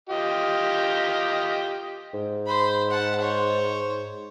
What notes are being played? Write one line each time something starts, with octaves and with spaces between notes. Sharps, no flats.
F4 G4 D#5
G#2
C5 B5
F#5 A5
C5 C#5